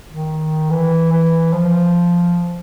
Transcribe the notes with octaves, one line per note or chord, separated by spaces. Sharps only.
D#3
E3
E3
F3